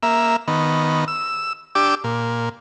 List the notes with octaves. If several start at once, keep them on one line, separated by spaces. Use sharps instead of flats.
A#3 E5
D#3 B3
E6
D4 G4 D6 E6
A#2